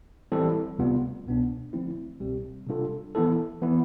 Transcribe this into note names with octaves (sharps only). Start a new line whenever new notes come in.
E3 G3 C4 E4 A4
D2 C3 G3 B3 F4
C2 B2 B3 D4
D3 F3 A3 C4 E4
C2 B2 G3 C4 G4
C3 G3 D4 F4 A4
E3 B3 E4 A4
E3 B3 E4